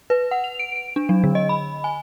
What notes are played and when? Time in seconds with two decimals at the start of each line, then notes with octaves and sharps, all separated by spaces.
0.10 B4
0.31 F#5
0.44 F7
0.59 D7
0.76 D7
0.96 D4
1.09 F#3
1.24 D3
1.35 D#5
1.49 B5
1.84 G#5